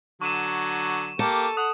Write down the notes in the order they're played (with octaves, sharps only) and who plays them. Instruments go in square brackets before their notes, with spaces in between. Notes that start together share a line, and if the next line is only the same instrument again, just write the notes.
[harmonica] D3 F#3 [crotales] C#6 D#7 E7
[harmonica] A#3 G4 [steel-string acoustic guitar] A4
[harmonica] F#5 [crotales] D#6